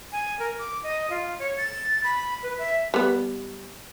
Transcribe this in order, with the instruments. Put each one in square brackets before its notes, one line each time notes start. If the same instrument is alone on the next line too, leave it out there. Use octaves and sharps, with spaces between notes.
[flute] G#5
A#4
D6
D#5
F4
C#5
A6
B5
B4
E5
[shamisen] G3 B3